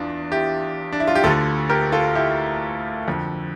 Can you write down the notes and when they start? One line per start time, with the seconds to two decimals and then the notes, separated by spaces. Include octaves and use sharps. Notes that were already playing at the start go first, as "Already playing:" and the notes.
Already playing: E2 E3 D4 F4
0.32 E4 G4
0.92 D4
1.00 E4
1.08 F4
1.15 G4
1.24 D2 F4 A4
1.27 D3
1.70 G4 A#4
1.92 F4 A4
2.15 E4 G4
3.07 F2 D3